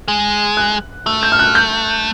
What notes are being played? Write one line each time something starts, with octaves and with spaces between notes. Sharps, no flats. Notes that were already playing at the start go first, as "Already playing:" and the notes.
G#3
F#6
A3 E6
G6
F6
F#6
G6